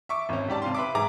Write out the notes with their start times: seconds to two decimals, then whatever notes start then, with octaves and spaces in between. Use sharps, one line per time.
0.09 E5 C#6 D6
0.29 G#1 C#4
0.48 G#2 G4 D5 A5
0.62 C3 F5 C6
0.75 B4 E5 D6
0.95 G#2 G#4 A#5 D6